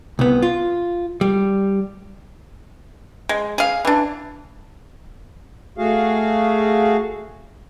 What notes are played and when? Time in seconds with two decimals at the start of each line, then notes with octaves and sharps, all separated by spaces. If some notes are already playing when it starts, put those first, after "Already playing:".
0.19 C2 B3
0.42 F4
1.21 G3
3.29 G#3
3.58 G#4 F5
3.85 E3 D4
5.78 A3 F#4 G#4 F5